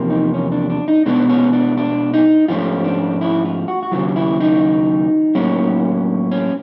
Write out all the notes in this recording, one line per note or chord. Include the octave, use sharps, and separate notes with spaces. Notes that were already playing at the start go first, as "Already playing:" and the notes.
Already playing: E2 C3 F3 A#3
D#4
C#4
D4
D4
D#4
B2 G#3 B3 D4
C#4
D4
D4
D#4
G#2 F3 A3 C#4 F4
D4
E4
F4
F#4
F#4
D#2 C#3 F#3 F4
E4
D#4
A2 F#3 A#3 C#4
C#4